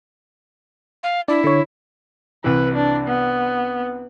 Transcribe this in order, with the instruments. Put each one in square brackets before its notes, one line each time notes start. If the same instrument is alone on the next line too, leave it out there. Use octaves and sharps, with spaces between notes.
[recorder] F5
[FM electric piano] D4 D5 [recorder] E4
[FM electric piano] D3 C#5
[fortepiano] C2 E3 [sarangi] B4
[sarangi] D4
B3